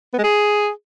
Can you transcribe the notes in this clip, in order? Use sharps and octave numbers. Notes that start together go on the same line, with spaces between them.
B3
G#3
G#4